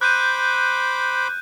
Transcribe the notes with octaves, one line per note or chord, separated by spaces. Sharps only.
C5 B5 D6 F#6 G6 D#7